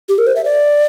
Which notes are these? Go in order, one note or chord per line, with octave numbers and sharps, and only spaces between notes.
G4
A#4
C5
E5
D5